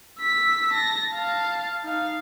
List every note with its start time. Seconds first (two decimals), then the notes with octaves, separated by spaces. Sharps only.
0.20 E6 B6
0.74 A5 A#6
1.15 F5 A5
1.84 D#4 F5